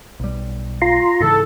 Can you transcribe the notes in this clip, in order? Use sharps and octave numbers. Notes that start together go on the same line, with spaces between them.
B1 G3
F4 A#5 C6
G#2 C#3 E3 A4